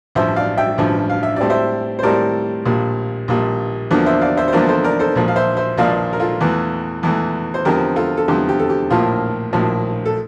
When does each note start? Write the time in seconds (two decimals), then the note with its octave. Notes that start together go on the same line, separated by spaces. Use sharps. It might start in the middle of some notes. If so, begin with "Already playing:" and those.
0.15 A1 G2 F3 C5 E5
0.36 D5 F5
0.57 E5 G5
0.78 A1 G2 F3
1.10 F5
1.23 E5
1.36 A2 G3 C4 D5
1.50 C5 E5
1.99 C5
2.03 A2 G3 C4 A#4 D5
2.66 A#1 A#2 G3
3.28 A#1 A#2 G3
3.91 E2 D3 F3 A#3 D4
4.06 C5 E5
4.21 D5 F5
4.37 C5 E5
4.48 C5
4.52 E2 D3 F3 A#3 D4 A#4 D5
4.69 A4 C5
4.84 A#4 D5
4.99 A4 C5
5.16 A#1 A#2 F3
5.28 F5
5.36 C5 E5
5.57 C5 E5
5.78 A#1 A#2 F3 D5 F5
6.13 A#4
6.20 F4 A4
6.41 E2 E3 A3
7.03 E2 E3 A3
7.54 C5
7.65 E2 D3 F3 C4 G4 A#4
7.96 F4 A4
8.17 A4
8.28 E2 D3 F3 C4 G4
8.49 G4
8.59 A4
8.70 G4
8.90 A#1 A2 F3 A#3 F4
9.53 A#1 A2 F3 A#3
10.05 A4